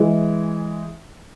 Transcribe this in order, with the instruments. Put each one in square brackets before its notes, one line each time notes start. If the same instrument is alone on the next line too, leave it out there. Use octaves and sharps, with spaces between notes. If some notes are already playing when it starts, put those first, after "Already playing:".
Already playing: [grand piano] E3 G#3